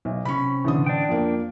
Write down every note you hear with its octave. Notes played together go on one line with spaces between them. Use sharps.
B1
C3 C#4 B5 C#6
A1 D3 D#6
D4 G5
F2 A#3